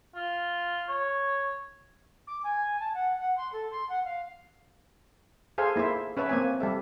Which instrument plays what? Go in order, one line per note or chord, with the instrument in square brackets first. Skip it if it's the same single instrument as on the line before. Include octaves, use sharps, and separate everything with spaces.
[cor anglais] F4
C#5
[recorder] D6
G#5
A5
F#5
F#5
C6
A4
C6
F#5
F5
[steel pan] G#4 A4 C5 F5 G#5
A#3 E4 C5 E5
C#4 B4 C#5 E5 A5
A#3 C4 G#5
G3 A4 E5